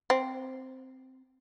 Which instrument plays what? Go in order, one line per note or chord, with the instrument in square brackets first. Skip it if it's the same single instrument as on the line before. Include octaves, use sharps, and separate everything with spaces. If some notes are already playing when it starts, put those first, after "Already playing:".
[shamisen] C4